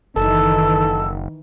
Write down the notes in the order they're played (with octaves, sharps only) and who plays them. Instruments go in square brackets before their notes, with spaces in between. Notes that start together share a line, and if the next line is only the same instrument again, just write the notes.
[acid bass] F#1 [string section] D#3 E3 [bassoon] A4 [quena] E6